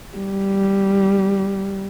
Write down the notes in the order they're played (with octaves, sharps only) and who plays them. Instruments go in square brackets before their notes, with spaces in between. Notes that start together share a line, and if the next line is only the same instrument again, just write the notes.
[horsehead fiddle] G3